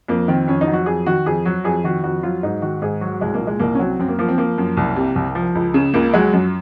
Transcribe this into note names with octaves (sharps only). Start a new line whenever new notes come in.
F2 A#3
D#3 C4
F2 C#4
D#4
F#3
F#4
F2 G#4
D#3 F#4
F2 G#4
F#3 F#4
F2 G#4
D#3 F#4
F2 F#4
F#3 F4
G#2 D#4
D#3 F#4
G#2 G#4
F#3 F#4
C2 G#3
A#3
A#2
G#3
C2 A#3
C#4
F#3 C4
F#2 C4
A#3
F3 A#3
C4
F3 A#3
F#2
C2
C3
C2
F3
C#2
C#3
C#2 A#3
F#3 G#3
F#2